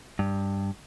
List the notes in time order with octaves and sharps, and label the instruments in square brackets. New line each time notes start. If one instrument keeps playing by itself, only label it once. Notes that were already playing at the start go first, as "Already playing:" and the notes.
[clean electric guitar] G2